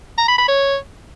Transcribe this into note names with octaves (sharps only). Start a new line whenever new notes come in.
A#5
B5
B5
C#5